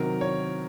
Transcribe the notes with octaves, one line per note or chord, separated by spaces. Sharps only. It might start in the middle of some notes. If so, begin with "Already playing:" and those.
Already playing: C3 D#3 F#3 A#4
C#5